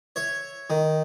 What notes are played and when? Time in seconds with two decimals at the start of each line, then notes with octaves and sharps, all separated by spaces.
0.16 C#5 E5
0.70 D#3